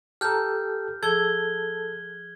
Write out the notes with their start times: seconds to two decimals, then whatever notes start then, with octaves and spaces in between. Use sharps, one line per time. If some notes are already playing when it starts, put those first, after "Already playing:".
0.21 G4 A4 A5 A#5 F6 G6
1.03 F3 G#4 A4 E6 G#6 G7